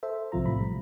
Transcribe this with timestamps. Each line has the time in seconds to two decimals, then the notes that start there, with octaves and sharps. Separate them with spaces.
0.03 A4 C5 E5
0.32 B1 C3 F3 F4 A#5
0.46 A2 B5
0.60 G3